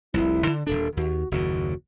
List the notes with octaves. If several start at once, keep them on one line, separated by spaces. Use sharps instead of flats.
F1 C2 E4
D3
D#1 G#1 D4 A4
D#2 F#4
F#1 D#2 A#2 F#4